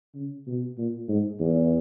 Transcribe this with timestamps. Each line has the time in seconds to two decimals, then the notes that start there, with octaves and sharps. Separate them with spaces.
0.15 C#3
0.47 B2
0.78 A#2
1.08 G#2
1.41 E2